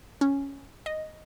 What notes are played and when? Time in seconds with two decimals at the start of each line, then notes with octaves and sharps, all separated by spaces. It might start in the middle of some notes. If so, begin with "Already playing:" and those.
0.21 C#4
0.86 D#5